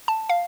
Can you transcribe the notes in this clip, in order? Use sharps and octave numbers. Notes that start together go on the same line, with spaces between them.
A5
F5